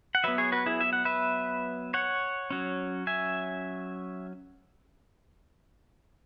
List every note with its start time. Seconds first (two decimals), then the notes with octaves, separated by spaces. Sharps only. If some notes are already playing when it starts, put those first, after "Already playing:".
0.15 F#5
0.24 F#3 B3 B4 E5
0.38 G#4 C#5
0.52 F#4 B4
0.66 E4 G#4
0.81 E5
0.93 F#5
1.05 B4 E5
1.94 C#5 F#5
2.50 F#3 C#4
3.07 E5 G#5